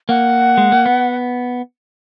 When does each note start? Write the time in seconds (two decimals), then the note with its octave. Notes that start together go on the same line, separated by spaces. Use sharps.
0.09 A#3 F#5
0.58 G#3
0.72 A#3
0.86 B3